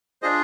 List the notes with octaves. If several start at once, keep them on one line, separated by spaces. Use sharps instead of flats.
D4 F4 G#4 C5 D#5